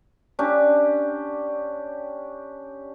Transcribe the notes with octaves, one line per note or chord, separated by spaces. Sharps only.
C#4 D4 G4